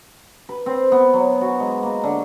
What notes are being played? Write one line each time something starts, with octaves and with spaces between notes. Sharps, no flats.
B4
C4
B3
F#3
F#4
G#3
A#3
D3